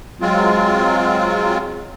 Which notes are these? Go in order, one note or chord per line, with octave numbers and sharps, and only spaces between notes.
F#3 G#3 C4 F4